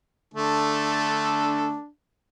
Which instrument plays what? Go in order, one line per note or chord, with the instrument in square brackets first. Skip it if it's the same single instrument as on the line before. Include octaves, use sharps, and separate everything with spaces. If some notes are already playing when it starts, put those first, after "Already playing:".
[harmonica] D3 A3 A4 [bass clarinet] D4